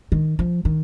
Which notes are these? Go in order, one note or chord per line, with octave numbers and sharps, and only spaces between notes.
D#3
F3
D#3